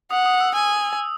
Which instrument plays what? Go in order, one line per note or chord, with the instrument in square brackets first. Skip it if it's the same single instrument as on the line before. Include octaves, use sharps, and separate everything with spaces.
[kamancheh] F#5 [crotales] D#6
[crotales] D#6
E6
[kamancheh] G#5 [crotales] E6